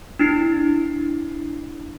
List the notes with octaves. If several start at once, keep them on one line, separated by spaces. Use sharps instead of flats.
D4 E4 C7